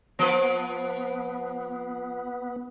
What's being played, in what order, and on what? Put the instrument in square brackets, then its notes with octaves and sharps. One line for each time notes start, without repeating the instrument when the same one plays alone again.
[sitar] F3 B4 [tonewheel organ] B3